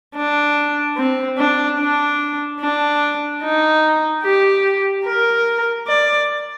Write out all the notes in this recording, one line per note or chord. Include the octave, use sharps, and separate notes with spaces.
D4
C4
D4
D4
D4
D#4
G4
A#4
D5